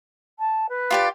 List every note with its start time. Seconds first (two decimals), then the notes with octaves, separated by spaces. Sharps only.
0.39 A5
0.69 B4
0.91 F4 G4 D5